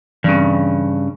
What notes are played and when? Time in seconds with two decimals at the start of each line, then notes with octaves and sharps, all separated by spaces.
0.24 G2 C#3 E3 C4